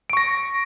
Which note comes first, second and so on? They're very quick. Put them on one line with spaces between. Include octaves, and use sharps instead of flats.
D7 C#6 A#6